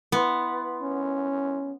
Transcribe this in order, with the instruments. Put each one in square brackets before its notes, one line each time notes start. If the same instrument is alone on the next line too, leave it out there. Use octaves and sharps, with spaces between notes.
[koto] B3 [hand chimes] E4 C6
[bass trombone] C#4